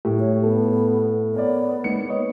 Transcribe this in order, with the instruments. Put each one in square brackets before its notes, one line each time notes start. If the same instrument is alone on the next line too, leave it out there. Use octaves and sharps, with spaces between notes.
[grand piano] A2 [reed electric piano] G4
[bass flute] C#5
[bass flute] B3 [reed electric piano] A4
[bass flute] B3 [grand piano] A#4 C#5 D5
[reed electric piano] G#3 A#3 D#4 [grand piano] C#7
[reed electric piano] B4 C#5 D#5